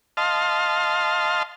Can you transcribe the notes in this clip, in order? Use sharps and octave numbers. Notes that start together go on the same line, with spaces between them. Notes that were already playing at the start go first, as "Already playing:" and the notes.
D#5 F5 A5 C6 F6